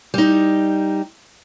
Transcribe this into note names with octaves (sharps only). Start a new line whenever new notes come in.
G3 D#4